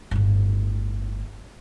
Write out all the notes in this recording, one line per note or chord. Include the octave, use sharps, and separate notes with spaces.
G1 A2